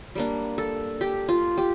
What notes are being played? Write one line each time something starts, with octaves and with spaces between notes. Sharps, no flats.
G3 A#3 D4
A4
G4
F4
G4